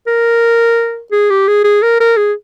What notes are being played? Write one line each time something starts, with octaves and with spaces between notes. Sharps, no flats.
A#4
G#4
G4
G#4
G#4
A#4
A#4
G#4